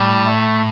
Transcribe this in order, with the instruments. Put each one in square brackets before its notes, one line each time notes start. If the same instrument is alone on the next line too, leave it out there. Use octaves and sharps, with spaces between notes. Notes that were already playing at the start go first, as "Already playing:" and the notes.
Already playing: [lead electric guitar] A2 [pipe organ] G3
[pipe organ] A3